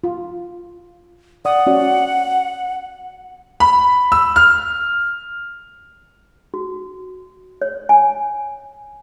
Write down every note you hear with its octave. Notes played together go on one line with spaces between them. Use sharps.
F4
D5 F#5 D#6
C#4 F#4 D5
B5
E6
F6
F#4
C#5
G#5